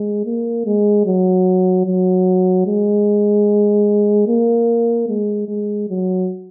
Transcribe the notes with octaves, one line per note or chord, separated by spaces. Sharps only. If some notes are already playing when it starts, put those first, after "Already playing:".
Already playing: G#3
A#3
G#3
F#3
F#3
G#3
A#3
G#3
G#3
F#3